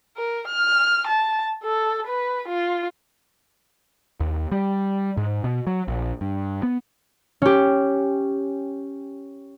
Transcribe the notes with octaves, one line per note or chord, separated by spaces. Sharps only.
A#4
F6
A5
A4
B4
F4
D#2
G3
G#2
B2
F#3
A#1
G2
B3
C#4 G4